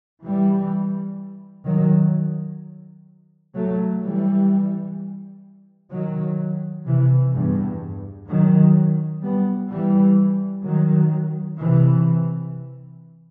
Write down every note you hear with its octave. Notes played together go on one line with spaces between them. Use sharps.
E3 G3
D#3 F#3
F#3 A3
E3 G3
D#3 F#3
C3 E3
E2 G2
D#3 F#3
G3 B3
E3 G3
D#3 F#3
C3 E3